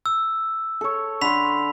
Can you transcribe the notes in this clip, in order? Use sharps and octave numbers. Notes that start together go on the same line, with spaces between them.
E6
A4 C#5
D3 B5 C6 B6 F7